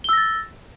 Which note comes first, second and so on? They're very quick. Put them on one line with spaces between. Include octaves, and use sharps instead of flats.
G7 E6 A#6 A6